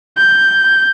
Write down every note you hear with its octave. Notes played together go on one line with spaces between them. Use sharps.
G6